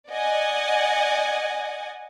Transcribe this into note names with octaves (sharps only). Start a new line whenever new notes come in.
D5 D#5 F#5 G#5